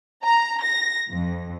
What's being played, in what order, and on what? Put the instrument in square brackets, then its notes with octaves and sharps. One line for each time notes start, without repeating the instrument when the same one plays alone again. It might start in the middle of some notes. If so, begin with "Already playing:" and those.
[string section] A#5
A#6
F2